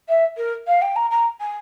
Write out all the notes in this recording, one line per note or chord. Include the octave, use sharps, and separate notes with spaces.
E5
A#4
F5
G5
A#5
A#5
G#5